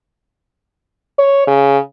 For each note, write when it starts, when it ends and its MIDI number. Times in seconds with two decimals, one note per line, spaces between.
1.18 1.43 73
1.47 1.78 49